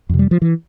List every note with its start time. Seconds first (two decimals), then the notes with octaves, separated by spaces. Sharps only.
0.09 F2 C3
0.19 G3
0.31 F3
0.42 E3